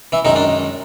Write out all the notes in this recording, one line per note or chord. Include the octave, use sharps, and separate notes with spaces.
E3 E4
F#2 D#3 G#3 D#4
D4